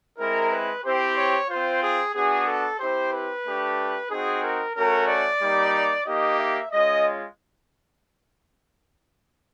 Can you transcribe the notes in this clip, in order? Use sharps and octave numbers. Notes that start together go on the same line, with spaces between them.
G#3 C4 E4 A#4
B4
C4 E4 G4 C5
C#5
C4 F4 C5
G#4
B3 D4 F#4 G#4
A4
C4 E4 G4 C5
B4
A3 D4 G4
C4 D#4 F#4 G#4
A#4
A3 C#4 F#4 A#4
D5
G3 A#3 D#4
A#3 D#4 G4 D#5
E5
G#3 C#4 F4 D#5